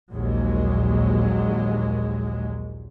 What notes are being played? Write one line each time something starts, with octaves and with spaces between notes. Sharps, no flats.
A#1 D#2 A#2 F#3 G#3